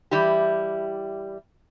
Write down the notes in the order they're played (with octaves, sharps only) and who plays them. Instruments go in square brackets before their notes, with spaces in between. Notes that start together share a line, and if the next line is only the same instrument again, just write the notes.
[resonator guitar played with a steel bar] E3 G3 E4 G4